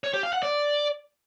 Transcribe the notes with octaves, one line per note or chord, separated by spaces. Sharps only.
C#5
G4
F5
F#5
D5